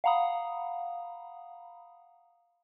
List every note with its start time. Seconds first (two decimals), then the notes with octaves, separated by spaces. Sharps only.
0.04 F5 F#5 A#5 B5 D#6